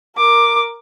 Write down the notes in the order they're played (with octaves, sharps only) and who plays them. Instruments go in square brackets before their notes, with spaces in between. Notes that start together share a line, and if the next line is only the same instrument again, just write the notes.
[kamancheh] A#4 D6